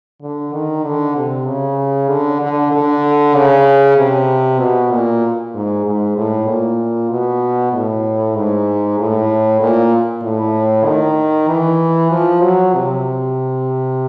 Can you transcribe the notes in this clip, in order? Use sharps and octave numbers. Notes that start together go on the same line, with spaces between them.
D3
D#3
D3
C3
C#3
D3
D3
D3
C#3
C3
B2
A#2
G#2
G#2
A2
A#2
B2
A2
G#2
A2
A#2
A2
D#3
E3
F3
F#3
C3